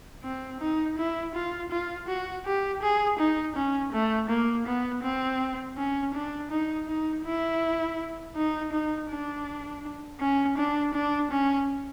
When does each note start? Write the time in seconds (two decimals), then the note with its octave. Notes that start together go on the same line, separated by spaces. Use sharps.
0.23 C4
0.60 D#4
0.97 E4
1.34 F4
1.71 F4
2.08 F#4
2.45 G4
2.81 G#4
3.18 D#4
3.56 C#4
3.92 A3
4.29 A#3
4.66 B3
5.03 C4
5.77 C#4
6.14 D4
6.51 D#4
6.87 D#4
7.25 E4
8.35 D#4
8.72 D#4
9.09 D4
10.20 C#4
10.57 D4
10.93 D4
11.30 C#4